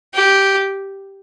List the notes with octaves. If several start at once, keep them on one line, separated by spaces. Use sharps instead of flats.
G4